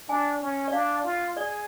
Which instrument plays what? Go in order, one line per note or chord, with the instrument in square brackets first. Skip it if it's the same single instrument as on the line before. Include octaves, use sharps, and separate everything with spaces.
[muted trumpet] D4 [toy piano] G#5
[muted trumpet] C#4
[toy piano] D5
[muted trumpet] D4 [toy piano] F5
[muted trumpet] F4
[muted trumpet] G#4 [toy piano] D5